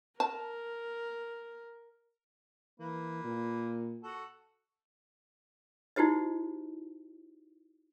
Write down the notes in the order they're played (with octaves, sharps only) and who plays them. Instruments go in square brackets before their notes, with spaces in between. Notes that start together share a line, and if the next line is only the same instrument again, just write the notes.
[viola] A#4 [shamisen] A5
[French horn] E3 [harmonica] A#3 B4
[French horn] A#2
[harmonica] F#4 A4
[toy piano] D#4 E4 F#4 G4 C5 D#5